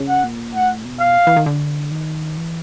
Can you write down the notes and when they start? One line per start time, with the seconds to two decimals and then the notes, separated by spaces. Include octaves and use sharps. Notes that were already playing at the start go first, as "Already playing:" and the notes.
Already playing: C#3
0.08 F#5
0.24 A#2
0.55 A2 F#5
0.85 B2
1.00 F5
1.27 E3
1.36 D#3
1.46 D3
1.91 D#3
2.37 E3